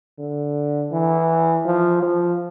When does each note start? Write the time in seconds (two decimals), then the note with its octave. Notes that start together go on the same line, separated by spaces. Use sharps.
0.19 D3
0.92 E3
1.65 F3
2.02 F3